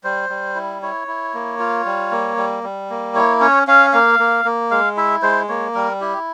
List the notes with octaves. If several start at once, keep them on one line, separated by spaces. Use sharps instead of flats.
G3 C5
G3
E4
E4 C#5
E4
A#3
F4
G3
A#3
G3
G3
A#3
E4 C#5
C#4 C#5
C#4 F5
A#3 F5
A#3
A#3
G#3 F5
E4 E5
G#3 C5
A#3 C#5
G3 A#4
E4 G4